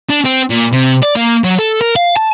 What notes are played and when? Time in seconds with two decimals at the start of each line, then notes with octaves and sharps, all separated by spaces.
0.09 D4
0.25 C4
0.50 A#2
0.73 C3
1.03 D5
1.16 A#3
1.44 F#3
1.59 A4
1.81 A#4
1.96 F5
2.17 A5